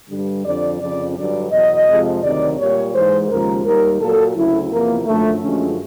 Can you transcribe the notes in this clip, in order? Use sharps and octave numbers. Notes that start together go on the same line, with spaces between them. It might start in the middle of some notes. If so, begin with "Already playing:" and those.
G2 D3 G3
F2 D3 F3 D5
F2 C#3 F3 D5
G2 D3 F#3 D5
E2 B2 F#3 D#5
F2 C3 F3 G#3
D2 C3 D#3 F#3 D5
A#2 G3 C#5
G#2 E3 G#3 C5
D#2 C#3 F3 G#3 A#4
D#2 D#3 G3 A#4
A#2 F#3 A4
D2 C#3 F#3 E4
E2 C3 F3 A#3
F#2 D3 F3 A3
F#2 D3 F3 G#3 C#4